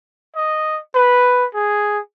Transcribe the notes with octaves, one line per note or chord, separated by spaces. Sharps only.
D#5
B4
G#4